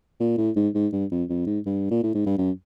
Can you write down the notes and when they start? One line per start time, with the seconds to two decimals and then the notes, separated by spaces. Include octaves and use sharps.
0.20 A#2
0.37 A2
0.56 G#2
0.75 G#2
0.93 G2
1.11 F2
1.29 F2
1.47 G#2
1.66 G2
1.91 A#2
2.03 A2
2.15 G#2
2.26 G2
2.38 F#2